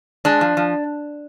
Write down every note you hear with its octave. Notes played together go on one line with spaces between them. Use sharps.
G#3 D4
F3
F3